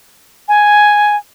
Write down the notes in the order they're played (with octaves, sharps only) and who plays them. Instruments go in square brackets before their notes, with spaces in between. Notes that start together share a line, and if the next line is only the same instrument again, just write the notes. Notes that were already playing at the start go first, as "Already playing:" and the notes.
[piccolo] G#5